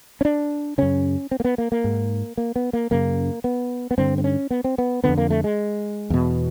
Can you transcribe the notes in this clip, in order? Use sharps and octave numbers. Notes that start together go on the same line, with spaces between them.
C#4
D4
F#2 C#3 C#4
C4
A#3
B3
A#3
A#3
G#2
A#3
B3
A#3
F#2 C#3 A#3
B3
B3
G2 D3 C4
C4
C#4
B3
C4
B3
F2 D3 B3
A#3
A3
G#3
E2 B2